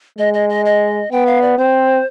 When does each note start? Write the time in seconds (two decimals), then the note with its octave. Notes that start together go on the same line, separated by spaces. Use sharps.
0.18 G#3 D#5
0.34 D#5
0.49 D#5
0.65 D#5
1.11 B3 G5
1.26 F5
1.42 D5
1.57 C4 C5